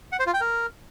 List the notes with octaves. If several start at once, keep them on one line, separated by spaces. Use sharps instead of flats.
F#5
C5
F4
G5
A#4